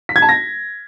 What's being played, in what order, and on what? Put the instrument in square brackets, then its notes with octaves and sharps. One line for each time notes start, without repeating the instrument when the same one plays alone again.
[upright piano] B6
G#6
A5
A#6